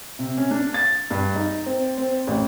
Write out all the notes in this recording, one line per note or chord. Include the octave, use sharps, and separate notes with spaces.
C3
C#4
D4
A6
G2
D#4
C4
C4
A1